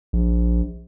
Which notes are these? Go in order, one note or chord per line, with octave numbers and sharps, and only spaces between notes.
A#1